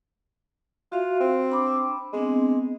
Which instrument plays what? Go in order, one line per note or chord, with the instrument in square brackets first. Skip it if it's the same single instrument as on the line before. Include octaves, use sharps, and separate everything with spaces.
[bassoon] F4 [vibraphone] F#4 E5 F5
[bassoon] C4
[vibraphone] D4 B5 D6
[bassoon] G#3 [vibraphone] B3 C4 D4